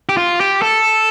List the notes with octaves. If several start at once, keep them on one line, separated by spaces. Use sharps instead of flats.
G4
F4
G4
A4